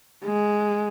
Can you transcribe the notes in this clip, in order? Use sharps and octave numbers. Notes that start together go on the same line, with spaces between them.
G#3